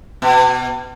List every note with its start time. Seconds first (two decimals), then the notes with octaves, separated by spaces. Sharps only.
0.22 B2